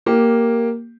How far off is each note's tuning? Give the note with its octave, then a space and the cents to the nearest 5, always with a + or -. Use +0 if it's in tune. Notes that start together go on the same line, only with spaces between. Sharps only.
A#3 +0 G4 +0